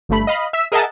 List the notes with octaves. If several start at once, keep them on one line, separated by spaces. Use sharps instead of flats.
G1 G2 A3 B5
D#5 F5 B5
E5 E6 B6
G#4 A#4 D#5 E5 F#5 A5